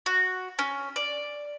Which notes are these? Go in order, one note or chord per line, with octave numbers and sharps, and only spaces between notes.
F#4
C#4
D5